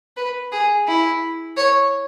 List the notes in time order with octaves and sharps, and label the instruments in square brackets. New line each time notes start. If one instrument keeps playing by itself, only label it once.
[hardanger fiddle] B4
G#4
E4
C#5